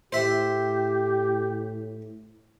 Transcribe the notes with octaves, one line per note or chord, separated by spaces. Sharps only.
A2 G4 C5 E5